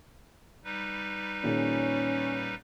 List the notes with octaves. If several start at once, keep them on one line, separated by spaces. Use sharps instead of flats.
G3 D#4 B4
A#2 D#3 C#4 G#4